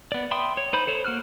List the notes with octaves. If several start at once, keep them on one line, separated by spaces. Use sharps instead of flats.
B3 D5
E5 G5 B5 C6 D#6
C#5
D#4 C5 B5 G6
A4 C5 C#5
A#3 F#4 F6 F#6